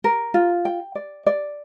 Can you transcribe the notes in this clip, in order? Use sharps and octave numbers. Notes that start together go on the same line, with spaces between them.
A#4
F4
G5
D5
D5